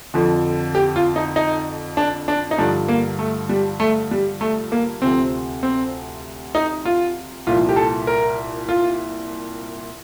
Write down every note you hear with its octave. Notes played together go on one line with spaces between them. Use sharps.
F2 D3 F3
G4
F4
D#4
D#4
D4
D4
D#4
G2 D3 F3 D4
A#3
A3
G3
A3
G3
A3
A#3
D2 C3 F3 C4
C4
D#4
F4
C2 A#2 F3 F4
G4
A4
A#4
F4